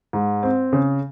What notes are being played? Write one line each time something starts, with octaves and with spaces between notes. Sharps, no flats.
G#2
C4
C#3